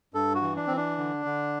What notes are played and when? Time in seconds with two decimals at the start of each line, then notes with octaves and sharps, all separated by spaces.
0.14 G2 A4
0.35 F#4
0.42 E3
0.56 D4
0.67 E3 C4
0.77 D4
0.98 D3
1.25 D3